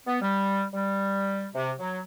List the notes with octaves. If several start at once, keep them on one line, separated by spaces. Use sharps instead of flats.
B3
G3
G3
C3
F#3